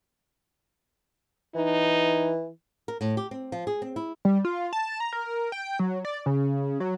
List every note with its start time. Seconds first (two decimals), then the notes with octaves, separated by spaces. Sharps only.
1.55 E3 D#4
2.88 A#4
3.01 A2
3.17 G4
3.31 C4
3.52 F3
3.67 G#4
3.82 C4
3.96 E4
4.25 G3
4.45 F4
4.73 A5
5.00 A#5
5.13 A#4
5.52 G5
5.79 F#3
6.05 D5
6.26 C#3
6.80 F#3